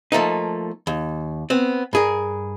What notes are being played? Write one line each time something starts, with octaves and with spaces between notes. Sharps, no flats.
F3 A3 A#3 D#4
D#2
B3 C4
G2 G#4 A#4